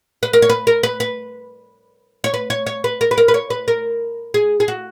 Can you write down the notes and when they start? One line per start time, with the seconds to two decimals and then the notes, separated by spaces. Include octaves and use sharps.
0.23 B4
0.33 A#4
0.42 C#5
0.49 B4
0.67 A#4
0.83 B4
1.00 B4
2.24 C#5
2.34 B4
2.50 C#5
2.66 C#5
2.84 B4
3.01 A#4
3.11 B4
3.18 A#4
3.28 B4
3.34 C#5
3.50 B4
3.68 A#4
4.34 G#4
4.60 G#4
4.68 F#4